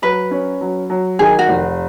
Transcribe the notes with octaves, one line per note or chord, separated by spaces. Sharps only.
F#3 B4
C#4
F#3
F#3
D#3 G#4
F#4
F1